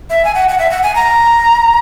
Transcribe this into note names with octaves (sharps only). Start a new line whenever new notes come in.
E5
G#5
F#5
F#5
E5
F#5
G#5
A#5